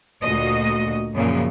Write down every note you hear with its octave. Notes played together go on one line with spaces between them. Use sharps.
D2 A#2 F#4 D#5
F#2 A#2 C#3 F3